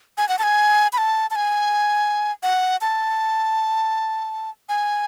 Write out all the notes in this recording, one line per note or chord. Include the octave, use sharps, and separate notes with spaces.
G#5
F#5
A5
G#5
B5
A5
A5
G#5
F#5
A5
G#5